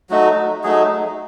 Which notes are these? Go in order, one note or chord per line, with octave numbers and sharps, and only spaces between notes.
F#3 A3 D#4 F#4
F#3 A3 D#4 G#4